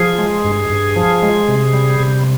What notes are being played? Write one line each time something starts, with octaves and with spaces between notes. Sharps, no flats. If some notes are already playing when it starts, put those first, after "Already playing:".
Already playing: F3 G#4
G#3
G2
G2
F3
G#3
C3
G3
C3